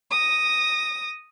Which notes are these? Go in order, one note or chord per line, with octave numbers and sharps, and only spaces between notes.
D#6 A#6